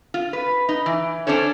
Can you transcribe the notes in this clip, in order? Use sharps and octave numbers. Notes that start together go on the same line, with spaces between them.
F4
B4
D#4
E3
C#4 D4 A4 C5 C#5